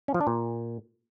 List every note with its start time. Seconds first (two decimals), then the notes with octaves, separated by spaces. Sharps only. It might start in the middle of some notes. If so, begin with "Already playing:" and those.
0.08 C#4
0.14 F3
0.21 D4
0.27 A#2